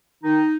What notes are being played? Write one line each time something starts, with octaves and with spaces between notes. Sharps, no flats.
D#3 D#4